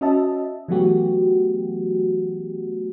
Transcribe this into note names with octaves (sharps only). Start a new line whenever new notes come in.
C#4 F#4 D#5 E5 A5
E3 F#3 A3 B3 F#4 G4